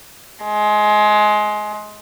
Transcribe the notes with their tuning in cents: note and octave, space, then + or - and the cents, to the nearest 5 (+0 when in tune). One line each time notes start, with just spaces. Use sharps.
G#3 +20